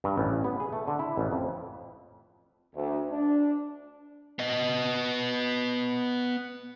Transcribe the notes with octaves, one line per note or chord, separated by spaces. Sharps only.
G2
A1
B3
G#4
A3
D3
E4
A1
F2
D2
D4
B3 D#5